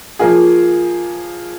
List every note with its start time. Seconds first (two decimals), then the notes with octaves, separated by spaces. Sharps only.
0.19 F3 A#3 F4 G#4